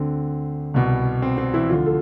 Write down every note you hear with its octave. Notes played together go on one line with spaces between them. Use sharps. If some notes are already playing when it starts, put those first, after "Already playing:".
Already playing: D2 D3 C4
C2 B2
C4
C4
E3 E4
D2 D3 F3 F4
A4